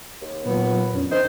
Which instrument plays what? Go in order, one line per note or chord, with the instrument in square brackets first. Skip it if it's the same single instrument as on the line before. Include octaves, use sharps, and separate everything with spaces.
[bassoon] D#2
[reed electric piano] A#2 F#3 F4 [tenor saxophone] B3
[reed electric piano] F2 C#4 D4
[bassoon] D#3 [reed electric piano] D4 D#5 [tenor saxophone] C5